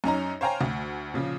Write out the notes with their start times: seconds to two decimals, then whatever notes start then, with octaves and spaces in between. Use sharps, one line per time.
0.04 F#2 C#4 D#4 A#5
0.41 C5 C#5 F5 G5 G#5 A#5
0.61 D2
1.14 A#2 C#3 F3